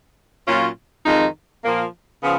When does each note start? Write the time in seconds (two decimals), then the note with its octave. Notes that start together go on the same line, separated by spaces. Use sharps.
0.47 A#2 F#3 C#4 F4
1.05 F2 D#3 G#3 D#4
1.64 A#2 F3 A#3
2.22 C#3 F3 B3